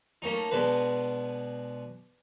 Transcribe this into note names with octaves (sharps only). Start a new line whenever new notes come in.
A3 A#3 C#4 D#4
B2 G#3 D4 B4